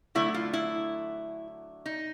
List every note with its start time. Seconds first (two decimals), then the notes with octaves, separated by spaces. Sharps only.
0.15 D3 F#3 A3 E4
0.34 F4
0.53 E4
1.86 D#4